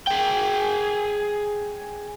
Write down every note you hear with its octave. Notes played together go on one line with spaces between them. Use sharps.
G#4 G5